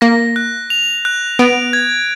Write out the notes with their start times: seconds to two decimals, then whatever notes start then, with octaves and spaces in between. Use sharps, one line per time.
0.01 A#3 A#6
0.36 F#6
0.70 F7
1.05 F#6
1.39 B3 D7
1.73 G#6